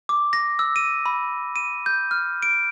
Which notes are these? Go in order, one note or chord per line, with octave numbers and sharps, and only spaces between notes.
D6
A#6
E6
D#7
B5
D#7
G6
F6
D7